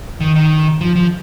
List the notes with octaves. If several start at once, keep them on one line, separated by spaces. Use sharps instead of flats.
D#3
D#3
F3
F3